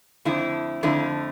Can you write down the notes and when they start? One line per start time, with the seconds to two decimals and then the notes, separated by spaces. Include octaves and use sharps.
0.25 F2 D3 A3 E4
0.83 F2 D3 A3 E4